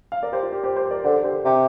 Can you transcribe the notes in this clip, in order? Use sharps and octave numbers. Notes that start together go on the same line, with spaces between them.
F5
A#4 D5
G4 C5
F4
G4
G4 C5
G4 C5
A#4 D5
D3 C5
A#4
G4 C5
C3